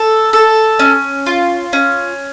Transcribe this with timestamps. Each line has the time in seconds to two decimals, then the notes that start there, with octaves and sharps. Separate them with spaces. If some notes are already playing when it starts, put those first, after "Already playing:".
Already playing: A4
0.33 A4
0.79 C#4
1.26 F4
1.73 C#4